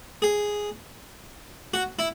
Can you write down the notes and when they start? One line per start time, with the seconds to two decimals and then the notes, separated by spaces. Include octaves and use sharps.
0.22 G#4
1.74 F#4
1.99 E4